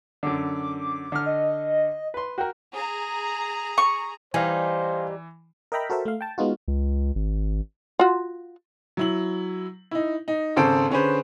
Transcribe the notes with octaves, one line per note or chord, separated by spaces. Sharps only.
F#2 D3 D6
D3 F6
D#5
B4 C6
F#4 A#4 G5
G#4 A#5
C#6
E3 G3 D#4 C5 F5 G#5
A#4 D#5 E5 G5 A#5 B5
F#4 A4 A#4 C5 E5
A3 F5
G5 A5
G#3 B3 D#4 F4 F#4
C#2
G#1
F4 F#4
F#3 E4 F#7
D#4 E4
D#4
G#1 C#3 A4 C5 D7
D3 C#4 G#4 B4 C5